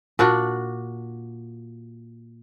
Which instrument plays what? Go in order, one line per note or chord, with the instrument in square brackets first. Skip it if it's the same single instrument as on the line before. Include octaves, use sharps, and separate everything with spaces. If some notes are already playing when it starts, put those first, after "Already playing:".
[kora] A#2 D4 F#4